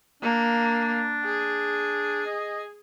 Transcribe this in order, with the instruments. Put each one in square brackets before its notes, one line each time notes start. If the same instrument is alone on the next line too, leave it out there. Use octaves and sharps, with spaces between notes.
[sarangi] A#3 [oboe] D4
[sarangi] G#4
[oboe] D#5